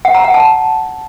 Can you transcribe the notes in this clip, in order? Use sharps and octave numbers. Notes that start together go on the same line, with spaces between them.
F#5
A#5
F#5
A5